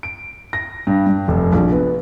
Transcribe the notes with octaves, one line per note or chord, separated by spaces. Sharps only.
D7
A#6
G2
G2
F1
A#1
B3